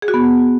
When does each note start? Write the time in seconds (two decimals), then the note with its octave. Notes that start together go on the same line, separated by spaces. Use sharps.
0.02 G#4
0.08 F#4
0.14 B3